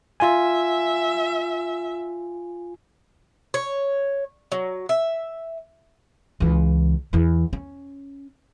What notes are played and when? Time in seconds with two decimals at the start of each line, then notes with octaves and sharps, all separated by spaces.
0.20 F4 E5 G#5
3.54 C#5
4.52 F#3
4.89 E5
6.40 C#2 E3
7.13 E2 E3
7.53 C#4